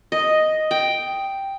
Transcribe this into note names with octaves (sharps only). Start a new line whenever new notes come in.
D#5
G5